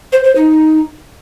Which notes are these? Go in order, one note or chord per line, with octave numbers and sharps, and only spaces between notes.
C5
C5
D#4